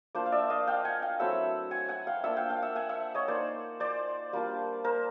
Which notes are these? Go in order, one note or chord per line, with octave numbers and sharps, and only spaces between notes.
A#3 D4 F4 C5 D5
F5
D5 E5
D#5 F5
F5 G5
F#5 G#5
F5 G5
F#3 A3 C4 E4 E5 F#5
F#5 G#5
F#5 G#5
F5 G5
A#3 D4 F4 E5 F#5
F5 G5
F5 G5
E5 F#5
F#5 G#5
E5 F#5
C#5 D#5
A#3 D#4 C5 D5
C5 D5
G3 A#3 D4 F4
A#4 C5